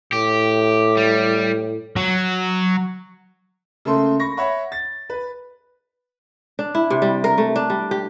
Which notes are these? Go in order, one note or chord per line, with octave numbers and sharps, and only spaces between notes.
A2 G4
G3
F#3
C#3 A3 A#3 A4 C6
B5 C#6 A#6
C#5 E5 F#5 B5 C#6
A6
B4
D4
E4
C3
G3
A#4
A3
D4
G3
G4